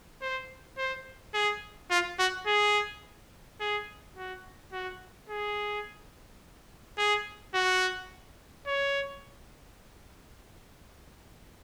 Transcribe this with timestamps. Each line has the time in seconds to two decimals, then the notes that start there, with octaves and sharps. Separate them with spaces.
0.21 C5
0.78 C5
1.34 G#4
1.91 F4
2.19 F#4
2.47 G#4
3.60 G#4
4.16 F#4
4.72 F#4
5.29 G#4
6.98 G#4
7.54 F#4
8.67 C#5